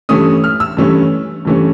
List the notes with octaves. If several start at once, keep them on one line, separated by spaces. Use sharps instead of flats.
G2 E3 A3 C#4 D#6
F6
E6
G2 E3 A3 C#4
G2 E3 A3 C#4